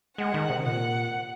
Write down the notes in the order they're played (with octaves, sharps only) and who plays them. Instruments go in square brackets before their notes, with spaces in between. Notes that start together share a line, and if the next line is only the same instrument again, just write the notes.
[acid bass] G#3 [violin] F#5
[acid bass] D#3
C3
[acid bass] A#2 [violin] F#5